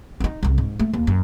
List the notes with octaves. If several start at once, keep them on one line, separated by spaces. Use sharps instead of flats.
D4 D#4
C2 C#3
G#2
A3
D#2
F#2